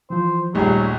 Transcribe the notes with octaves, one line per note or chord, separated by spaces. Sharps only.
E3 F3 C5
A#1 D#2 F#3 G3 A3 D#4 G#4